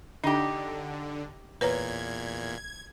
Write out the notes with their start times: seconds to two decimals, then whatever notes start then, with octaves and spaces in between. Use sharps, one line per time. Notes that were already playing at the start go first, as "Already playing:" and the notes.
0.24 D3 D4 D#4 G4
1.61 E2 A#2 B4 C#5 A#5 G#6